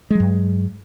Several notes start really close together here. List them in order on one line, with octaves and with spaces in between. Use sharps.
G#3 F#3 G2